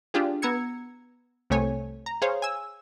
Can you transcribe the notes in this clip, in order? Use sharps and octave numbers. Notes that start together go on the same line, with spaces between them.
D4 F4 G4 G#4
B3 A#5 E6 G#6 C#7
C2 C3 A3 C#5 G#5
A#5
G#4 C5 C#5 F5
G#5 E6